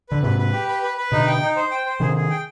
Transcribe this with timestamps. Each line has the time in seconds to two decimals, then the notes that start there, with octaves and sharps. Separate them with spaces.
0.09 D3 B4
0.23 G#2 C3 B4
0.38 B4
0.53 G4
0.68 B4
0.83 B4
0.97 B4
1.12 B2 D3 D#4
1.27 G5
1.41 D#4
1.56 C5
1.71 G5
1.86 C5
2.00 C3 D#3 G#4
2.16 G#4
2.30 G5